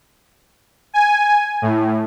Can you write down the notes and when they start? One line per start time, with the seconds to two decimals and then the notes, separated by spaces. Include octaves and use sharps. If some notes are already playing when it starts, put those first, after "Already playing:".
0.93 G#5
1.62 A2